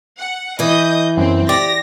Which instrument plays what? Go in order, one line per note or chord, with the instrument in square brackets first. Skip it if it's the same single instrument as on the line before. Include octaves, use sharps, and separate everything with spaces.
[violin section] F#5
[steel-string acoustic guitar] E3 B4 [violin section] D#5 D#6 G6
[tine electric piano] F#2 [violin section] C4
[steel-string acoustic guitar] G4 [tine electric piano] D5 [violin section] A#6